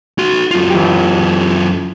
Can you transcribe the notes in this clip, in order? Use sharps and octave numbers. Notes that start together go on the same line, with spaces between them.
F#4 C6
F#2 F4
E3 G4